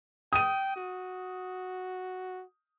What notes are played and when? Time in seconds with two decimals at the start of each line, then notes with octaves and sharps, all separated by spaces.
0.33 G5 D#6 D#7
0.76 F#4